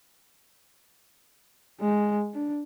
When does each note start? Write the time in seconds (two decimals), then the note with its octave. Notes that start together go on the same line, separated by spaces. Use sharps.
1.81 G#3
2.34 D4